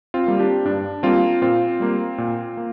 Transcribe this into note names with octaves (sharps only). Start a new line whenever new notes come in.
C4 F4
G3 A#3
D4 G4
G2 D4
G3 A#3 C4 F4
A#2 C4 F4
G3 A#3
A#2
A#3